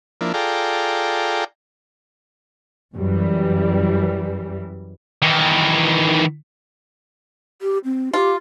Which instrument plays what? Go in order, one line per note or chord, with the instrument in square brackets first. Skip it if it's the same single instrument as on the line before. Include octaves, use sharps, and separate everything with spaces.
[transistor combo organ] F3 A#3 D4 E4
F4 G#4 A4 D5 G5 A#5
[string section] F#2 E3 G3
[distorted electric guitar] D#3 E3
[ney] G4
C4
[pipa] F4 [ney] G4